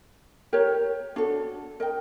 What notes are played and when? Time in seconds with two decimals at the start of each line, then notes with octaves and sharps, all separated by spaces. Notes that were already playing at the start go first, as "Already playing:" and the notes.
0.53 G4 A#4 C#5
1.16 D4 F#4 A4
1.80 A#4 D#5 G5